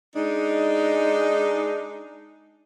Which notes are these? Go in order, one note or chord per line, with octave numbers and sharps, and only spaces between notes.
G#3 D4 D#4